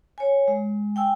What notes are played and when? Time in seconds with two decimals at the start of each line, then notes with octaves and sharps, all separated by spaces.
0.18 C#5 G#5
0.48 G#3
0.96 G5 G#5 E6